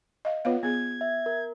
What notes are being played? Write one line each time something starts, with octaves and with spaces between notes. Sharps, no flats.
D#5 F5
B3 F4 C#5 F5
B3 G#4 G#6
E5
A#4